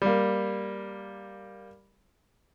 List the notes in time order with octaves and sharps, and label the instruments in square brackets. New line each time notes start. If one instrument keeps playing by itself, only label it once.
[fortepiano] G3 A#3